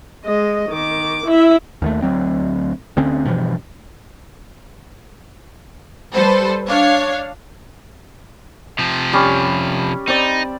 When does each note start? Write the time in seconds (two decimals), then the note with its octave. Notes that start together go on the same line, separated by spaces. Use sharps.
0.25 G#3 D#5
0.69 D#3 D6
1.26 E4 E5
1.82 D#2 D#3 A3
2.02 D2 F#3 C4
2.97 D2 D3 C4 C#4
3.25 G2 B2 E3 F3
6.13 G3 A4 B4 C5
6.68 D4 C#5 F5
8.79 C3 F3
9.13 G3 C#4
10.08 C4 D#4 D5